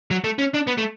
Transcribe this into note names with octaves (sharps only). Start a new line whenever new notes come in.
F#3
A3
C#4
D4
B3
A3